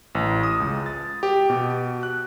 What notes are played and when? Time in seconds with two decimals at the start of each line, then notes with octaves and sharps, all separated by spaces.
0.15 A1
0.43 D#6
0.60 C#2
0.86 A6
1.23 G4
1.50 B2
2.03 F#6